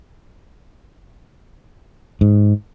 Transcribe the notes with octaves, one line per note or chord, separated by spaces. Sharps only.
G#2